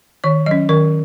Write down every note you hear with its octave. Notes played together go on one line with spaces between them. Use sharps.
D#3 C#5
F#3 C#4 D#5
D#3 A#4